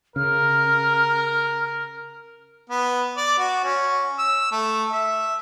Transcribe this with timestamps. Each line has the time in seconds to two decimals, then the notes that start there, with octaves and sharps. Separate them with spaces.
0.16 C#3 A#4 F6
2.70 B3
3.17 D5
3.38 F#4
3.64 C#4
4.18 E6
4.52 A3
4.91 E5